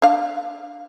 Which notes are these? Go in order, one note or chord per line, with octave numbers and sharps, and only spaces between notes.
D4 F5